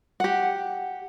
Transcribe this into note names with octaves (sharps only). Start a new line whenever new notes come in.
G4 F#5